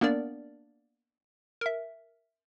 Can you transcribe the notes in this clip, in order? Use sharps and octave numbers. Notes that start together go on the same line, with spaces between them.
A#3 B3 D4 A#4 D5
A#4 E5